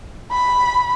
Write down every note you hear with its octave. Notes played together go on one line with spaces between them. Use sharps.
B5